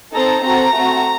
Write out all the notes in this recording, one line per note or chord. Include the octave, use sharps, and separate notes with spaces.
C4 D#4 A4 A#5
C4 F#4 A4 A#5
A3 C4 F#4